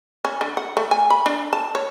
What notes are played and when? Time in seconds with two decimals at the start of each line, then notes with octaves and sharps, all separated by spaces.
0.25 C#4
0.41 D3
0.57 F#5
0.77 A3
0.91 G#5
1.10 B5
1.26 D4
1.53 A5
1.75 C#5